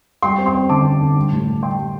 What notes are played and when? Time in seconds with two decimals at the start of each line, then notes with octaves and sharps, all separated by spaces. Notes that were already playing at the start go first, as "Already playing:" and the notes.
0.22 G3 G5 C6
0.38 C4
0.46 G5 C6
0.55 C4
0.69 D3 A5 D6
0.85 C4
1.01 D3
1.16 G3
1.32 A2
1.48 A2
1.63 G3 G5 C6
1.79 G3